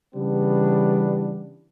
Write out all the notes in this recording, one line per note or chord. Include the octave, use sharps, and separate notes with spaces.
C#3 E3 G3 B3 D4